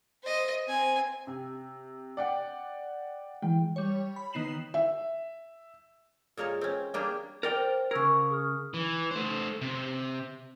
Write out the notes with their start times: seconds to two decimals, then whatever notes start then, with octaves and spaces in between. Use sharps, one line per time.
0.23 C5 D#5
0.67 C4 G#5
1.27 C3
2.17 D5 F#5 G5
3.42 E3 G#3 G5
3.76 G3 C#5
4.16 B5
4.33 D#3 B3 D#4 C7 E7 F#7
4.74 E5
6.37 A#2 G#3 A#4 C#5 A5
6.61 C4 C#4
6.94 G3 A#3 C#4 D4 G4 G#4
7.43 A#4 D5 G5
7.56 C5
7.91 C#3 A#4 C#6 E6 G#6
8.03 C#6
8.30 G#4 D#6 F6
8.74 E3
9.11 A3 C5
9.61 C3